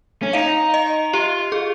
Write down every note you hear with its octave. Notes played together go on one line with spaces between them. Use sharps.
C#4
D#4 F5
D#5
F4 G4
G#4